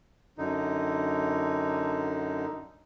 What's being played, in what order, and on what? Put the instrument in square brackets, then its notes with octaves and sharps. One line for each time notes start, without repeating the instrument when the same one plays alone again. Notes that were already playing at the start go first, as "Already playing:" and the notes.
[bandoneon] F#2 D3 D#4